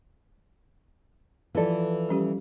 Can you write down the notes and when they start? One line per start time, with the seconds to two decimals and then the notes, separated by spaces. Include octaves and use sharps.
1.55 E3 F3 A4 D5
2.09 G3 C#4 G4